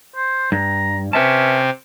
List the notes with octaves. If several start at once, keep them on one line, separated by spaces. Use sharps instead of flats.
C5
G2 A#5
C3 C4 C#4 B4 E5 A5